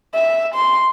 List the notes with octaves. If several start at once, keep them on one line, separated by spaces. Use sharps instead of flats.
E5
C6